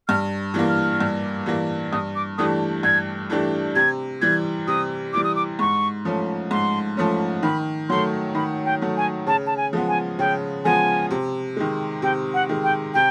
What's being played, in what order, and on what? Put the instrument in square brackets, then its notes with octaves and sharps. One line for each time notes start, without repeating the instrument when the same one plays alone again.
[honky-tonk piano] G2 [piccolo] F6
[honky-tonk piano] E3 G3 A#3
[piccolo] F6
[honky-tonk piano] G2
E3 G3 A#3
[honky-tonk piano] G2 [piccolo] D#6
[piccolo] D6
[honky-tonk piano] E3 A3 D4 G4 [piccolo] D#6
[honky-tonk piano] G2 [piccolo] G#6
[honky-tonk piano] E3 A3 D4 G4
[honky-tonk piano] C3 [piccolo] G#6
[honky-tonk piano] E3 G3 [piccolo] G#6
[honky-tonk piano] C3 [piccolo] D#6
[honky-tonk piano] E3 G3 [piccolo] D6
[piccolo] D#6
D6
[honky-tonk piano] G#2 [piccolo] C#6
[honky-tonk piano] F3 A3 C#4
[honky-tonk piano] G#2 [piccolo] C6
[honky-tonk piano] F3 A3 C#4
[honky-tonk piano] D#3 [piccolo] B5
[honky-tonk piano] F#3 A3 [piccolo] C6
[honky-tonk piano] D#3 [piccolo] B5
[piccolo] G5
[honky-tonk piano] F#3 A3
[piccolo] G#5
[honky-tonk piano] C#3 [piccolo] A5
[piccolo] A5
G#5
[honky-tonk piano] F3 G#3 B3
[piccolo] G#5
[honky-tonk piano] C#3 [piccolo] G5
[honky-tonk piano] F3 G#3 B3 [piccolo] G#5
[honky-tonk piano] C3
D#3 G#3
[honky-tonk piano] C3 [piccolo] G5
[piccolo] F#5
[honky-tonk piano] D#3 G#3
[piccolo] G5
[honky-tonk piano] C3 [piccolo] G5